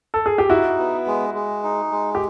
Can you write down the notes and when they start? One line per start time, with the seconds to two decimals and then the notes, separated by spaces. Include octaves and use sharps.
0.14 A4
0.26 G#4
0.38 G4
0.50 D#4 E4 F#4
0.79 B3
1.07 G#3
1.34 G#3
1.63 D#4
1.91 G#3
2.15 G4